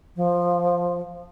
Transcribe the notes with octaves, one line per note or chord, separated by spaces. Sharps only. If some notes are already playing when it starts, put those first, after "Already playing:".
F3